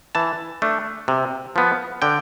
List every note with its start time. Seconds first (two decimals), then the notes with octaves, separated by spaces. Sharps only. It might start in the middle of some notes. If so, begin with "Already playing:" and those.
0.15 E3 A5
0.62 A3 D4
1.08 C3
1.56 F3 B3
2.02 D3 G5